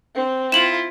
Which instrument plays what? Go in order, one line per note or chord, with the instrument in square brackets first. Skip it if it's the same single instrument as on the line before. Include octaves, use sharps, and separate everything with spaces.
[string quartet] C4
[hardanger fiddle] E4 F4 [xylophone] E7 F#7